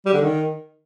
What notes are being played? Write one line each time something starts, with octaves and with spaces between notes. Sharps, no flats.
G3
D3
D#3